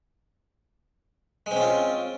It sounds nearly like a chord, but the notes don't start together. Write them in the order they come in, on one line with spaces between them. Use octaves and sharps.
G#3 C4 C#4 F4